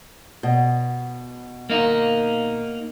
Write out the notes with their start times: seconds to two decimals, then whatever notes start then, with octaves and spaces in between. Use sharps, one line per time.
0.43 B2
1.70 A#3 D#4